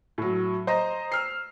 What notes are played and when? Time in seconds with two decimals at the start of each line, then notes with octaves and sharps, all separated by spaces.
0.18 A2 F#3
0.67 C5 D#5 A#5
1.12 E6 F6 C7